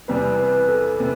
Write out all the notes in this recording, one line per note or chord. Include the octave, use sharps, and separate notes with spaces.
E2 C3 G3 B4
B4
A4
C3 B4